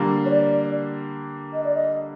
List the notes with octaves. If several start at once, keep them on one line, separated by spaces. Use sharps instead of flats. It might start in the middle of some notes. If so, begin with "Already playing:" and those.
Already playing: D3 G3 A#3
C#5
D5
D#5
D5
D#5